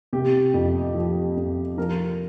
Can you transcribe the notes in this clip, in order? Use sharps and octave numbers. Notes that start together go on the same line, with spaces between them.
C3 G4
F2
F3
F2
F3 A#4